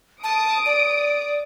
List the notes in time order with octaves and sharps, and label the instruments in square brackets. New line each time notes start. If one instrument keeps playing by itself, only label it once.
[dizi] A5 [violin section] D#6 D7
[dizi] D5